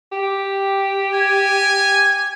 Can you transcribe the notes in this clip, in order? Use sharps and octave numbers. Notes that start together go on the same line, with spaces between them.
G4
G#5